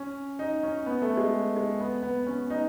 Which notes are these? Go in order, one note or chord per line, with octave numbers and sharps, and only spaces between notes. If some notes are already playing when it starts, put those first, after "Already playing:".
Already playing: C#4
D#4
C#4
B3
A3
G#3
G#3
B3
B3
C#4
D#4